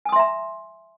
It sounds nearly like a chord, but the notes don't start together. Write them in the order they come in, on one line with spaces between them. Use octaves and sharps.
G#5 D#6 C6 E5 A#5